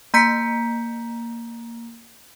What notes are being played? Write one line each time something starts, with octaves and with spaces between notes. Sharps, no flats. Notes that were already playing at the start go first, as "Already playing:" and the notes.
A#3 A#5 G6 B6 C#7